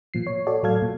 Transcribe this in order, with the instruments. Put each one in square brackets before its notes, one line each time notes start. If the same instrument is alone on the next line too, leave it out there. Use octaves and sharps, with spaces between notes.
[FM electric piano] A#2 F3 C7
C#5
F#4 A4 C#5 D5
A2 F#3 A4 F5 G#6
A#2